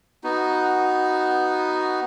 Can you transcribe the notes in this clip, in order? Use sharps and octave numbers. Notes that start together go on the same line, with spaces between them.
B3 D#4 F#4